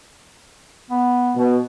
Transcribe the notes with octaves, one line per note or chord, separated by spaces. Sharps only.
B3
B2